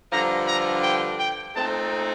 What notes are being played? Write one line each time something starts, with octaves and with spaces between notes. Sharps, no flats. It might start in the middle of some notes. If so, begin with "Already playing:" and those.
G2 D3 F3 A#5
A#5
G5
G5
A#2 A3 C4 D#4 A5